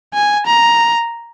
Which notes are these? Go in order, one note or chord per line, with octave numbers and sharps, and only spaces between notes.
G#5
A#5